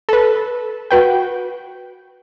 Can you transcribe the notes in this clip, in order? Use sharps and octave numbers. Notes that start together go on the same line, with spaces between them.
A4 B4
F#4 B4 G5